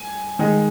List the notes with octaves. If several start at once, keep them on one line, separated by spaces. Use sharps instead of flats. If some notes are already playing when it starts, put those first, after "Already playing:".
Already playing: G#5
D#3 G#3 D#4